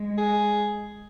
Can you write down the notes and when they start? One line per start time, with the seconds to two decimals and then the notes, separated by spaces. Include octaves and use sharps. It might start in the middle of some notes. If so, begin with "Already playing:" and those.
Already playing: G#3
0.18 G#4